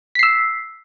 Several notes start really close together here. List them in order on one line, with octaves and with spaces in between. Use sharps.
B6 C7 E6